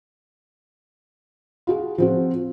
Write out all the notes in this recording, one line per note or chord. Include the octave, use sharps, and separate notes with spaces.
F4 F#4 G#4
F3 C4 F#4